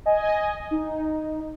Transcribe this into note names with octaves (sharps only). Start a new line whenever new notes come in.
D#5 G#5
D#4